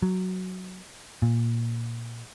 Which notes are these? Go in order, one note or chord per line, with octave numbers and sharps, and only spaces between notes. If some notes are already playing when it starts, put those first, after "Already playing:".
F#3
A#2